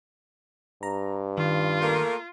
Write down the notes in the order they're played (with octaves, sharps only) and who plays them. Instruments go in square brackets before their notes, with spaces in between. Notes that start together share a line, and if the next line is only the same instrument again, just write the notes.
[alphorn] G2 [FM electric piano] A#5
[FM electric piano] D#3 [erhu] F4
[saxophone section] A3 A#3 A#4